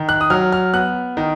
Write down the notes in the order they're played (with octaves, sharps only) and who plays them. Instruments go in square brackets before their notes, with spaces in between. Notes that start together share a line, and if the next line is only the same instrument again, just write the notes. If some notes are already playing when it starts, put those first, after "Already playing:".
Already playing: [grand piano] D#3
F#6
D#6
F#3 F6
F6
B3 F#6
D#3